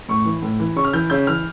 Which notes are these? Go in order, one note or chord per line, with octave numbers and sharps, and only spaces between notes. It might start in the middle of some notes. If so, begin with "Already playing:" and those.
A2 C#6
E3
A2
E3
C#3 C#6
F6
E3 G6
C#3 G6
E3 F6